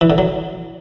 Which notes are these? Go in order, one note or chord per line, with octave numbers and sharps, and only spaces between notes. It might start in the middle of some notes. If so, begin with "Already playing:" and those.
E3
D3
F#3